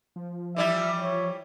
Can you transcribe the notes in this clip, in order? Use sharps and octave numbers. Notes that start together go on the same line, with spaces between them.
F3
E3 G3 E4 E5
C#5